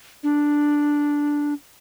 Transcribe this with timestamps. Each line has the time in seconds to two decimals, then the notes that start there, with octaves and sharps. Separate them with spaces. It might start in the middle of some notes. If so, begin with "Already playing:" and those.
0.23 D4